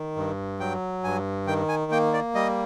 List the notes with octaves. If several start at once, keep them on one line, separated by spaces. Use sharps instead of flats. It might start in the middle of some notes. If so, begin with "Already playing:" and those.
Already playing: D#3
G2
F#3 G5
G2 G#5
D#3 G5
G#5
A#3 G5
D5
G3 D#5